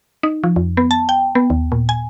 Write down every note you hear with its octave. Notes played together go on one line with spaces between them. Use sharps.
D#4
F3
F2
B3
A5
G5
B3
D#2
A#2
G#5